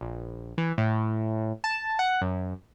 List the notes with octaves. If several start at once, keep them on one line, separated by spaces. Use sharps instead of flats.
A#1
E3
A2
A5
F#5
F#2